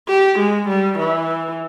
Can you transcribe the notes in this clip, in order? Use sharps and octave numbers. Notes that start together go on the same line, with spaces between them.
G4
G#3
G3
E3